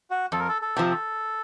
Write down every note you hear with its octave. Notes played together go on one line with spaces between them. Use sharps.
F#4
F2 A4
A#4
A4
A4
C3 F3
A4